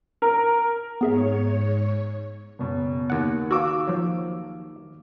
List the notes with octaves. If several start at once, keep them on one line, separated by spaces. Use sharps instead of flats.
A#4
G#2 B3 G#4 C#5 E5
F#1 B2
D#2 F#5
F#4 F5 D6 E6
F3 F#3